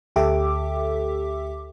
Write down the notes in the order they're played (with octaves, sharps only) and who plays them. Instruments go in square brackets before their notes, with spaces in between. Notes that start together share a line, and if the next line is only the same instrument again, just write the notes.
[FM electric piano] D2 G4 A4 E5 D6